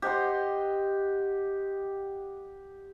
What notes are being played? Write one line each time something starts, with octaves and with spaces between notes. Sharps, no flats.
G4 D#5 F#5 C6